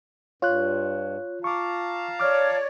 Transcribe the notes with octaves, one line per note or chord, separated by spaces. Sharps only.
G2 F4 C#5 F#6
F5 A5 A#5 C#6 D6
C#5 D5 D6 F6